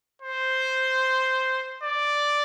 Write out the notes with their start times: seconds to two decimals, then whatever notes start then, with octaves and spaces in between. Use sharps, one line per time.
0.22 C5
1.83 D5